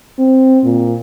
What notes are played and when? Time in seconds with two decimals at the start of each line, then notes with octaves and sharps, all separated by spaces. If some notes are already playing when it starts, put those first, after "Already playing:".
0.19 C4
0.64 A#2